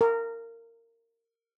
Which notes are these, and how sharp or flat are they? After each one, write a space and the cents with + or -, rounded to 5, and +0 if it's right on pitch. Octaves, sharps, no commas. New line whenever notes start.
A#4 -20